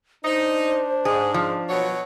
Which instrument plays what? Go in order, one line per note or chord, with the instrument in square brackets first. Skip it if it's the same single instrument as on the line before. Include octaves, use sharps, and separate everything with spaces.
[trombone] D4 [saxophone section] D#4 [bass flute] C5
[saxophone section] G#2 [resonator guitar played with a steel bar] G#4
[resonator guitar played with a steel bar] F3
[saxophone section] B2 F#3 C#5